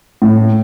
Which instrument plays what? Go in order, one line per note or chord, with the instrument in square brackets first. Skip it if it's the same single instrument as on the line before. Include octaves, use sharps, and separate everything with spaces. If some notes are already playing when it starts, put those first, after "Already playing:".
[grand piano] A2